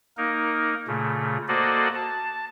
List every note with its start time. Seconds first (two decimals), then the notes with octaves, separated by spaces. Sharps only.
0.17 A#3 D#4 A#4
0.88 A#2 C#3 A3
1.48 A#3 F#4 A4 C5 D5 D#5
1.95 A5